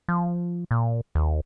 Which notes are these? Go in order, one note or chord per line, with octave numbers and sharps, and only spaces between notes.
F3
A#2
D#2